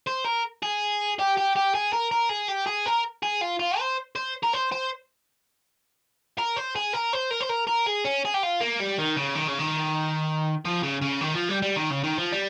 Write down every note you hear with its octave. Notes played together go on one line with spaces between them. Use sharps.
C5
A#4
G#4
G4
G4
G4
G#4
A#4
A#4
G#4
G4
G#4
A#4
G#4
F4
F4
C5
C5
A#4
C5
C5
A#4
C5
G#4
A#4
C5
A#4
C5
A#4
A#4
G#4
C#4
G#4
G4
F4
A#3
G3
D#3
C#3
D#3
C#3
D#3
F3
C#3
C#3
D#3
F3
G3
G3
D#3
C#3
D#3
F3
G3